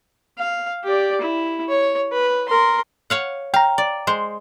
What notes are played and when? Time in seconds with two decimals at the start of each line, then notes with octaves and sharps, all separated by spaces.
0.38 F5
0.84 G4 D5
1.21 E4
1.69 C#5
2.12 B4
2.49 A#4 C6
3.10 C#5 F5 F#5
3.54 F5 G5 A#5
3.78 D5
4.07 G#3 C5